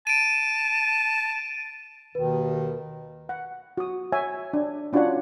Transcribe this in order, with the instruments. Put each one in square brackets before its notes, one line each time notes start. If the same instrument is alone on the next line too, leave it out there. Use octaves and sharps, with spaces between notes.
[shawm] A5 [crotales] D7 D#7
[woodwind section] D#2 B2 D#3 [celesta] B4
[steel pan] F#5
F#4 D#6
C#5 E5 G#5
D4
C#4 D4 F4 F#4 C#5 F#5